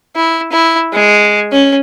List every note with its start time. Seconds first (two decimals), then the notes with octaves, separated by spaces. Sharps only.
0.16 E4
0.52 E4
0.93 G#3
1.52 C#4